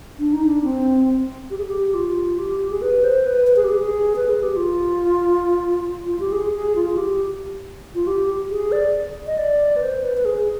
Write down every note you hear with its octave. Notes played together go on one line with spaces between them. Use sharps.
D4
D#4
D4
C4
G4
G#4
G4
F4
G4
G#4
B4
C5
B4
B4
G#4
G4
G#4
B4
G#4
G4
F4
F4
G4
G#4
G#4
F4
F4
G4
F4
G4
G#4
D5
D#5
D5
B4
C5
B4
B4
G#4